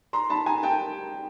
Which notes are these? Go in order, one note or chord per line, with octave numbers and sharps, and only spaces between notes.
A#5 C6
A5 B5
G#5 A#5
G5 A5